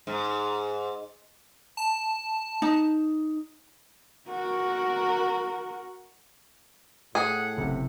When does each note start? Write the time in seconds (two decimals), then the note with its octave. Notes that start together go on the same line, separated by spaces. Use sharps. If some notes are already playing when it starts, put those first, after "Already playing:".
0.07 G#2
1.77 A5
2.62 D#4
4.28 F#4 A#4
7.15 A2 G#4 F#5
7.57 F#1 C3